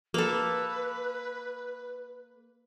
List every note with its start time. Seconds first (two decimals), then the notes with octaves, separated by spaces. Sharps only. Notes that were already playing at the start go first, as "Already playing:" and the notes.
0.14 A#3 A4 B4